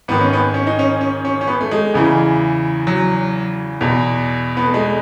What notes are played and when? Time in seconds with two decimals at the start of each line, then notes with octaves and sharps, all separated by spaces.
0.08 G#2 D#3 B3
0.21 C#4
0.33 B3
0.54 C#4
0.67 D#4
0.79 C#4
1.01 C#4
1.25 C#4
1.41 C#4
1.47 B3
1.61 A3
1.71 G#3
1.94 E2 C#3 E3
2.87 F#3
3.81 E2 B2
4.57 B3
4.66 A3
4.74 G#3